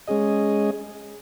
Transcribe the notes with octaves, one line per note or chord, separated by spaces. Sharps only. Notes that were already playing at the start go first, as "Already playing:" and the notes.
G#3 C#4 G#4 D#5